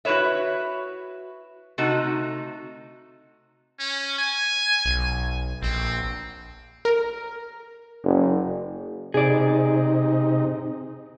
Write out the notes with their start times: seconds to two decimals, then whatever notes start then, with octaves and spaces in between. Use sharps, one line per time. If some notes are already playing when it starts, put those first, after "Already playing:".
0.05 E4 F#4 G4 B4 C#5 E5
1.78 C3 A3 D#4 F#4
3.79 C#4
4.18 G#5
4.85 B1
5.62 A#1 C4
6.85 A#4
8.04 F#1
9.14 C3 D#4 G#4 D5